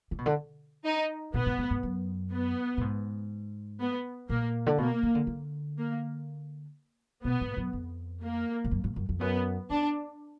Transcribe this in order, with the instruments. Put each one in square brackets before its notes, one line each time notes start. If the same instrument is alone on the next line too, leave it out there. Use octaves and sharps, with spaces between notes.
[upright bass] D3
B2
D3
[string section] D#4
[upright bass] A#2 [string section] B3
[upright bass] G#2
G#2
G#2
F#2
[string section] B3
[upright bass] A#2
G#2
[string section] B3
[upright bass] A#2 [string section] A#3
[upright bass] D3
[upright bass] B2 [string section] A#3
[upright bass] D#3
D3
D3
[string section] A#3
[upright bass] B2 [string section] B3
[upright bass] G#2
F#2
F2
[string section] A#3
[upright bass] G#2
F#2
G#2
F#2
F2
[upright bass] F#2 [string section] B3
[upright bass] F2 [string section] D4